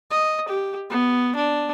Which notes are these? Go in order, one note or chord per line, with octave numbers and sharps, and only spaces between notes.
D#5
G4
B3
D4